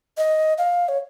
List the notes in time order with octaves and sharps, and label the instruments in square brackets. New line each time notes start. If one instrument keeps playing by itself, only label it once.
[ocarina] D#5
F5
C#5